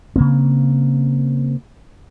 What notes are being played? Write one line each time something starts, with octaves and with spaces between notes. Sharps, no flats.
C#3 A#3 C4